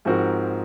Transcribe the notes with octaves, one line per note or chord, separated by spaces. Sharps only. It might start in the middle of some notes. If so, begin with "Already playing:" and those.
G#2 F3 C4 F#4 A#4